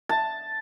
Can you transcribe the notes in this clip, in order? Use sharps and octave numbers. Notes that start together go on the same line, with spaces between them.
A5